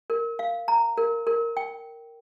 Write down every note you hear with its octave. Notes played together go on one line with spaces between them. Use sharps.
A#4
F5
A#5
A#4
A#4
G5